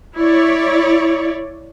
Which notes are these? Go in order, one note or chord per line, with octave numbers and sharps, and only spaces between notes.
E4 C#5 D5